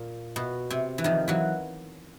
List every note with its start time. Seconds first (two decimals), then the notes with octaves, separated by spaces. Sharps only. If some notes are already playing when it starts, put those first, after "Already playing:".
Already playing: A#2
0.36 B2
0.70 C3
0.98 E3
1.04 D#3 F3
1.28 E3 F#3